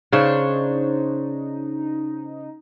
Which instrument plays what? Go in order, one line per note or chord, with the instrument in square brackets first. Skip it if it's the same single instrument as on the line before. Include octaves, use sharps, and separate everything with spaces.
[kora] C#3 [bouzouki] D4 C5 C#5 [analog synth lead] D#4